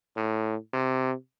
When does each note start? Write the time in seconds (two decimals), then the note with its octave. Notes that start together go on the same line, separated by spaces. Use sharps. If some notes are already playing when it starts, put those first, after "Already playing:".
0.16 A2
0.73 C3